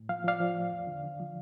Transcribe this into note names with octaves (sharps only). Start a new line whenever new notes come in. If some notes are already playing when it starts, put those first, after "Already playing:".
Already playing: A2
F3 F5
F3 D5 F5
F3
A2
E2
D3
D3
F3